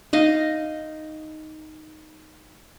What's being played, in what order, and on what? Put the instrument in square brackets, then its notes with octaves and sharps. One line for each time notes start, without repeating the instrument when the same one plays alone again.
[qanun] D#4 D#5 F5